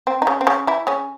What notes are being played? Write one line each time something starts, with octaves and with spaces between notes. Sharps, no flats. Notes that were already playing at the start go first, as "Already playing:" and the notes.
C4
D#4
C#3 C#4
C4
C#3 C#4
E3 E4
C#3 C#4